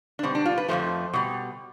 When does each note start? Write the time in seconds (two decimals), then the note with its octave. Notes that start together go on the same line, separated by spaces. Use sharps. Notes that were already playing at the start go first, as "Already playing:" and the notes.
0.19 D4
0.23 B2 G3 C4
0.35 D4
0.46 F4
0.58 B4
0.68 F2 C3 F3 A3 C5
1.13 B2 G3